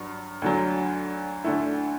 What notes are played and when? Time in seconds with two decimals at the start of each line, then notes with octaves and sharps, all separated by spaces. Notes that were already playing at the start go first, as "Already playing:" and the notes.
Already playing: G2 F#3
0.42 D2 D3 F#3
1.44 D2 D3 A3 E4